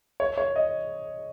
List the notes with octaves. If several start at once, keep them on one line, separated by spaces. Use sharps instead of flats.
C#5
C#5
D#5